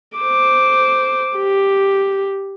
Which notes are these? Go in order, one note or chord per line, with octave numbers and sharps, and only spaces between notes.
C5 D6
G4